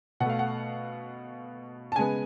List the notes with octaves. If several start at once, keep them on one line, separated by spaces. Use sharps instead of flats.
B2 A3 F5 F#5
F#5
A5
C#3 G#3 B3 G#5